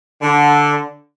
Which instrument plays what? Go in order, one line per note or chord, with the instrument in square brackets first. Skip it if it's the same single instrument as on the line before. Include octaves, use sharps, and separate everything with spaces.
[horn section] D3